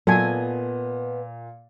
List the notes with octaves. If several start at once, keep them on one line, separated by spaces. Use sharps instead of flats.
A#2 F#3 B3 A4 D#5 G#5